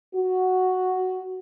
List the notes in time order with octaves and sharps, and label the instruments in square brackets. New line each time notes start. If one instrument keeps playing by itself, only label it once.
[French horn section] F#4